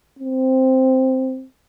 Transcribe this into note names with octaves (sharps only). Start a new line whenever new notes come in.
C4